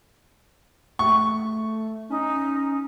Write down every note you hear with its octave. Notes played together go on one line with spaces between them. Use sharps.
A3 C#6
C#4 D#4